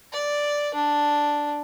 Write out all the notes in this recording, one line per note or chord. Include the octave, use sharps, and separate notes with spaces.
D5
D4